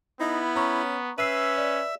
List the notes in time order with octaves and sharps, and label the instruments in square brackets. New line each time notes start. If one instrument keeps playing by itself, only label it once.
[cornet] B3 [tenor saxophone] D#4 [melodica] E4
[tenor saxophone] C#4 [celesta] A#5 C#6
[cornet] C#4 [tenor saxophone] B4 [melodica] E5 [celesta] E6 C7 D#7
[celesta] D5